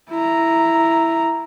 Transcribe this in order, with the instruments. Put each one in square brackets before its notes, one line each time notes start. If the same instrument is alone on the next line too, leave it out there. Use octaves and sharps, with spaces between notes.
[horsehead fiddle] E4 A#5